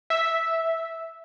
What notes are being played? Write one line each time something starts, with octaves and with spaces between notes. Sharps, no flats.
E5